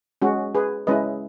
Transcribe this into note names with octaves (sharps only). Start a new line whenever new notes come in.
G#3 C#4 F#4
G#4 B4
G#3 C#4 E4 B4 D#5